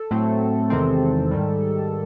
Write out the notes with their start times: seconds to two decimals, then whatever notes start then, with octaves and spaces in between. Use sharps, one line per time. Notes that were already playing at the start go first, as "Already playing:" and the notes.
Already playing: A4
0.11 A2 F#3 A3 C4
0.70 E2 C3 D#3 G#3 C4
1.31 G#2 D#3 G3